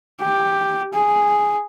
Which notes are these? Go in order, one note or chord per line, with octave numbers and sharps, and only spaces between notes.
G4
G#4